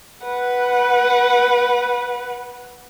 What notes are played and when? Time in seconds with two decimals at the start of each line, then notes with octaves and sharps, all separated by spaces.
0.24 B4 F#5